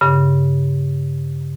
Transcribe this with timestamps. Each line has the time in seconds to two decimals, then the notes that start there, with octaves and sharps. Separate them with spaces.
0.01 G2 C#3